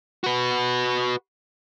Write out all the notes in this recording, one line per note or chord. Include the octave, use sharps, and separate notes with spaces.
F#4 B4